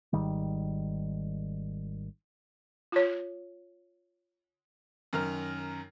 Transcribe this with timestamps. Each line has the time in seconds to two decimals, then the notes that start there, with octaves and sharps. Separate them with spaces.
0.13 G#1 D#3 G3
2.92 F4 C#5
5.13 F#2 D#3 A#4 F6